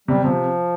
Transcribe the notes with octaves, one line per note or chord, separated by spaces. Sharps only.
C3 G3
C3 F3